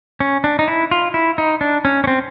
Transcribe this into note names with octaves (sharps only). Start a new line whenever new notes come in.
C#4
D4
D#4
E4
F4
E4
D#4
D4
C#4
C#4
C4